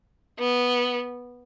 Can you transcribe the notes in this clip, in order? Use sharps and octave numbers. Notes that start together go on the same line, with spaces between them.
B3